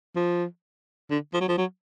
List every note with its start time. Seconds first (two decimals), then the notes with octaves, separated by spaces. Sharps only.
0.16 F3
1.11 D3
1.34 F3
1.41 F#3
1.48 F3
1.58 F#3